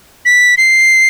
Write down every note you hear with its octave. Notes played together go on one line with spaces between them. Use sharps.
B6
C7